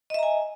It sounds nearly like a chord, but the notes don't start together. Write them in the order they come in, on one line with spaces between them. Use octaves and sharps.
D#5 E5 A#5 G#5